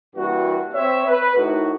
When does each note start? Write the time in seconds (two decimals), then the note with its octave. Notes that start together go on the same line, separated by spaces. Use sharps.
0.16 G2 E3 A#3 F#4
0.74 C4 C#5 E5
1.07 B4
1.36 A2 D#3 D#4 F#4